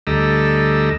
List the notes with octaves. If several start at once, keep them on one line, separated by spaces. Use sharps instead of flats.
D2 G3 A4 D#5 A#5 E6